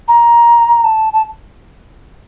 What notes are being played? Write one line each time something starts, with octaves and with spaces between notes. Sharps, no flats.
A#5
A5
A5